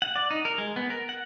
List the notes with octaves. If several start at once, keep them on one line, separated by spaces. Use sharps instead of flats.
F#5
D5
D#4
A#4
G#3
B3
A#4
F#5